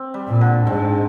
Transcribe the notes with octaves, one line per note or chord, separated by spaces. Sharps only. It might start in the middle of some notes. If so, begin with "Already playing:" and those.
Already playing: C4
G3
A#2
D3
G#2 C4